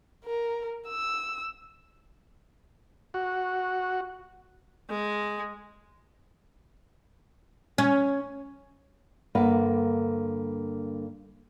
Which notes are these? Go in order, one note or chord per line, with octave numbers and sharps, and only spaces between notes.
A#4
E6
F#4
G#3
C#4
G2 D3 A#3 A#4 B4 F#5